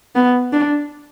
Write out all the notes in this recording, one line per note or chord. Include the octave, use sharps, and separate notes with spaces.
B3
D4